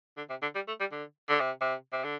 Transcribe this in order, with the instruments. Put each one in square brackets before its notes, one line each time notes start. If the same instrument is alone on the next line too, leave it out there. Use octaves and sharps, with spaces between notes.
[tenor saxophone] D3
C3
D3
G3
A3
G3
D3
D3
C3
C3
C3
D3